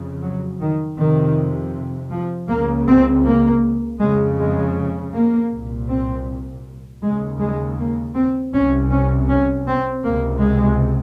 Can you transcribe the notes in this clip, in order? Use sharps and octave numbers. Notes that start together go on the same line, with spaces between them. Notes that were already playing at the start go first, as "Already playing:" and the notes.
Already playing: F2 C#3
F#3
D#3
F2 C3 D#3
F3
C#2 C#3 A#3
C4
A#3
F2 C#3 G#3
G#3
A#3
C2 A#2
C4
D#2 C#3 G#3
G#3
A#3
C4
C2 C3 C#4
C#4
C#4
C4
C#2 C3 A#3
G#3